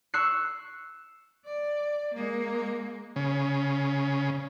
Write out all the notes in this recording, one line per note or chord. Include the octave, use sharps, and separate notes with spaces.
C#6 E6 F#6 C7
D5
G#3 A#3
C#3